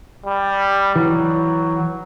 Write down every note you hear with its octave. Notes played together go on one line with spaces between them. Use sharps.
G3
E3 F#3